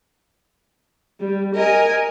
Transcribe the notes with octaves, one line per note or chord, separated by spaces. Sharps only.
G3
A#4 D#5 G#5